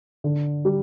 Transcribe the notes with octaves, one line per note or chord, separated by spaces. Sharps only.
D3
G3